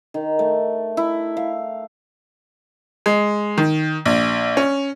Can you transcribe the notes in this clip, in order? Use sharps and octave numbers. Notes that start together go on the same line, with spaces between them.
D#3
A3
E4
F5
G#3
D#3
A#1
C#4